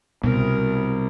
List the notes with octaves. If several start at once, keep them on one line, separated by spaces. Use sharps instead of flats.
C2 B2 A#4